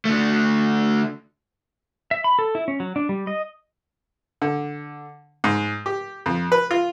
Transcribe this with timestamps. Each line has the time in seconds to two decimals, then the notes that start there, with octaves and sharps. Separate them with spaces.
0.05 D3 A3
2.11 E5
2.24 B5
2.39 A4
2.55 E4
2.68 C#4
2.80 F#3
2.96 D4
3.09 G3
3.27 D#5
4.42 D3
5.44 G#2
5.86 G4
6.26 F2
6.52 B4
6.71 F4